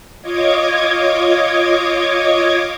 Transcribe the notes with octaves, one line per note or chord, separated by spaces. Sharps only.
F4 C#5 D#5 D6 G#6